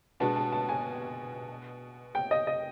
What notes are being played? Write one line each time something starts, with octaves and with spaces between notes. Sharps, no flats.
B2 G#3 B3 D4 F#4 A5
A5
A5
G#5
G5
D#5
D#5